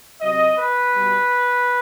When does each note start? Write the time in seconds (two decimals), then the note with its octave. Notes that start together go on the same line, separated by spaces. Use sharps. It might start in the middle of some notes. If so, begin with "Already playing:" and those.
0.20 C3 F#3 C4 D#5
0.56 B4
0.92 B2 G3 B3